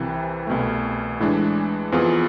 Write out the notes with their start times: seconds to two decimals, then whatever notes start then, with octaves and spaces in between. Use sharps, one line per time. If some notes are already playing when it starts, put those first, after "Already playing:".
Already playing: C2 C3 E3
0.47 C2 B2 A3
1.20 A2 E3 G#3 D4
1.92 F2 E3 B3 F4 G#4